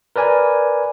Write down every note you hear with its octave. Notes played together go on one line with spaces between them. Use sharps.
A#4 B4 D5 G#5